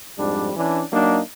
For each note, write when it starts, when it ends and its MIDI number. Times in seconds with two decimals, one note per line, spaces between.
0.18 0.52 41
0.18 0.52 44
0.18 0.52 55
0.18 0.52 62
0.56 0.83 52
0.56 0.83 61
0.56 0.83 62
0.92 1.20 54
0.92 1.20 58
0.92 1.20 62
0.92 1.20 63